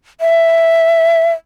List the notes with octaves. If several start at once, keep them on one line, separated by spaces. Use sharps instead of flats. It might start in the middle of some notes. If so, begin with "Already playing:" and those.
E5